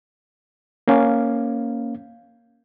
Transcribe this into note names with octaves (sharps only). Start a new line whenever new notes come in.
A#3 C#4 F5